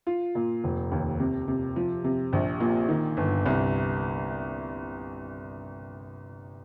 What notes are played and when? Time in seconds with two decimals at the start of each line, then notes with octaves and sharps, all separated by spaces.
0.07 F4
0.35 A#2
0.64 F1
0.92 D#2
1.20 C3
1.48 C3
1.76 F3
2.04 C3
2.33 A#1
2.60 A#2
2.89 D#3
3.17 G1
3.46 C2